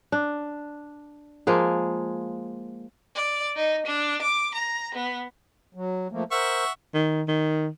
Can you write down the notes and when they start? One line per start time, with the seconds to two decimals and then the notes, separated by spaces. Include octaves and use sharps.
0.12 D4
1.47 F3 G#3 A#3 G#4
3.15 D5
3.56 D#4
3.86 D4
4.22 D6
4.55 A#5
4.95 B3
5.75 F#3
6.12 F3 A3 A#3
6.31 A#4 C5 E5 F#5 C#6
6.94 D#3
7.28 D#3